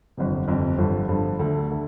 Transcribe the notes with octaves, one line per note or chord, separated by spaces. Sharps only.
G1 F2 C3
G1 F2 C3
G1 G2 D3 F3
G1 G2 D3 F3
D2 D3 A3
D3 A3